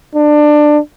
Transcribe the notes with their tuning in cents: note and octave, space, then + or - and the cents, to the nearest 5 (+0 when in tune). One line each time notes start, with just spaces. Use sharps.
D4 +20